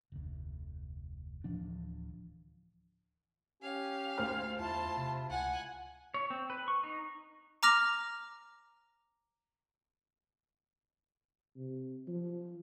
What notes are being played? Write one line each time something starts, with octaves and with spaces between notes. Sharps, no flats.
F1 D2
D1 E3 F3 D4
C#4 G4 F5 G#5
D2 C5 F6
E2 E4 F4 A5 C6
C3
C#2 F#5 G#5
C#5
C4
B4
C#6
D#4
A#5 D6 F6 A#6 F7
C3
F3